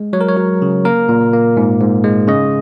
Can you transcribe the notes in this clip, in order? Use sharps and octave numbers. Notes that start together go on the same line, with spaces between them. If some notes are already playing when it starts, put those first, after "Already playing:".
Already playing: G#3
F#3 C#5
A#4
C#5
F#3
C#3
A#3 A#4
A#2
A#3
G#2
G#2
G#3
C#3 D#5